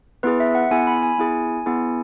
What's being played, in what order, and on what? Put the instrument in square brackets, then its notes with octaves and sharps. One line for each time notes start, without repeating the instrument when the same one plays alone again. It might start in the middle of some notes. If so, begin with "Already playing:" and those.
[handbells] B3 E4 G#4 B4
E5
F#5
B3 E4 G#4 G#5
B5
G#5
B3 E4 G#4
B3 E4 G#4